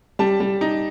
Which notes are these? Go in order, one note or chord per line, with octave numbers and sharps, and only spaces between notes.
G3 A5
G3
D#4